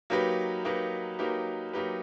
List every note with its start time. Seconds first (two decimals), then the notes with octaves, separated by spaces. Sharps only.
0.10 F#3 A#3 D#4 G4 B4
0.65 F#3 A#3 D#4 G4 B4
1.19 F#3 A#3 D#4 G4 B4
1.73 F#3 A#3 D#4 G4 B4